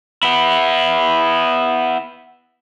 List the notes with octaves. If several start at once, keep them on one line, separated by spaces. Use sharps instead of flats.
B3 E4